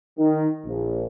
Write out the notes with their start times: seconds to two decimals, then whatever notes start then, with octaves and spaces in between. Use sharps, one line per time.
0.18 D#3
0.65 A#1